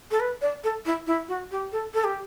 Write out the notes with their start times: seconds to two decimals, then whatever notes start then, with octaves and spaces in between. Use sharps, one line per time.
0.11 A4
0.20 B4
0.42 D5
0.64 A4
0.86 E4
1.07 E4
1.28 F#4
1.51 G4
1.72 A4
1.94 A4
2.04 G4